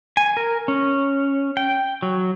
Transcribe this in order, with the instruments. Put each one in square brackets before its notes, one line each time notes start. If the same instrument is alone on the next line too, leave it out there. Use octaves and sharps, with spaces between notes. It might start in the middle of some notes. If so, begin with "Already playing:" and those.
[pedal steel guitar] G#5
A#4
C#4
G5
F#3